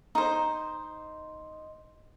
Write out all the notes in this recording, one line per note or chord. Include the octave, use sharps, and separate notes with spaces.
D#4 C5